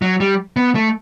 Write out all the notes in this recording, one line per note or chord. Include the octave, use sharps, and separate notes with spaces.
F#3
G3
B3
A3